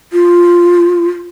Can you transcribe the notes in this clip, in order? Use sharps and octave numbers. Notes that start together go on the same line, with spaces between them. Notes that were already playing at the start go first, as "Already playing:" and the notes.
F4